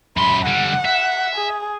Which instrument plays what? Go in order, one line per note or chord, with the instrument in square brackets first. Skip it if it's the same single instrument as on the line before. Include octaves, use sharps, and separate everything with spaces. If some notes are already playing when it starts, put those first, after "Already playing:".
[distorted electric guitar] F#2 C6 [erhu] B5
[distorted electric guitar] D3 G3 [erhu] F#5
[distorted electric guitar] E5
[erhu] G#4